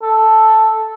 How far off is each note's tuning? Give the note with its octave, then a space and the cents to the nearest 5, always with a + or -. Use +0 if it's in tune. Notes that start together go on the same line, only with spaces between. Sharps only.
A4 -5